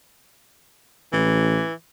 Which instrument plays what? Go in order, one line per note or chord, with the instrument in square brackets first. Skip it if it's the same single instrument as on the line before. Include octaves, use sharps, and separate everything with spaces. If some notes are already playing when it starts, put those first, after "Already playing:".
[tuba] A1 [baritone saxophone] E3